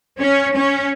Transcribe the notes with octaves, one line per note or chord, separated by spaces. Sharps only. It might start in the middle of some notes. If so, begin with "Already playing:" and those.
C#4
C#4